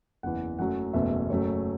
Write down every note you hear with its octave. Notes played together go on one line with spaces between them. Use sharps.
F#1 E2 E3 F#5
F#1 F#2 F#3 A3 F#5
F#1 E2 B2 A3 E5
F#1 F#2 F#3 A3 C#5